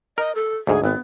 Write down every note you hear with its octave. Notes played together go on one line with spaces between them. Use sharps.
A#4 D#5
A4
D2 G#2 G#4
G#1 B3